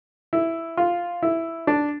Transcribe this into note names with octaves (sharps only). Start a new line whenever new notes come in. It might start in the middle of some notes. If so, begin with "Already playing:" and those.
E4
F4
E4
D4